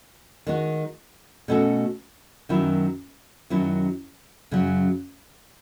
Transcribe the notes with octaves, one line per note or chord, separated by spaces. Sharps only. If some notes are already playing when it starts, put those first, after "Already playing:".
D#3 G#3 D#4 F#4
B2 A3 C#4 F#4 A4
F#2 D#3 F#3 B3 E4
F#2 D#3 F#3 C#4 E4
F#2 C#3 F#3